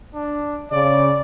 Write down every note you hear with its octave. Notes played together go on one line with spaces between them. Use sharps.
D4
C#3 D5